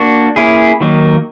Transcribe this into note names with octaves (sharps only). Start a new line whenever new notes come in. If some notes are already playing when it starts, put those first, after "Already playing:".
Already playing: A#3 D4 F#4
A#3 C#4 E4 G#4
D#3 F#3 A#3 D#4